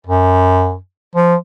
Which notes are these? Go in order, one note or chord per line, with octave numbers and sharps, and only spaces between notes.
F#2
F3